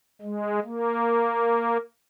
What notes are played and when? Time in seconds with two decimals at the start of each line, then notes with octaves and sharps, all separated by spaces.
0.22 G#3
0.64 A#3